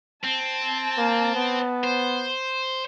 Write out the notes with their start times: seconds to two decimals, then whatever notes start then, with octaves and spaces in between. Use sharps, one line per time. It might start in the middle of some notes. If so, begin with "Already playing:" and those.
0.24 C4 A5
0.97 A#3
1.35 B3
1.84 C5